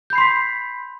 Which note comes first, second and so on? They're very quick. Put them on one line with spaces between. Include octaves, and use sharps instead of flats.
G6 B5 C7 C6 B6